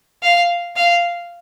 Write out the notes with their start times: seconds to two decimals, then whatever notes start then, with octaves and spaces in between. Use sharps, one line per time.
0.23 F5
0.76 F5